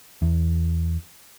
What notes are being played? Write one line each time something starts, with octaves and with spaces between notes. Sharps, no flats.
E2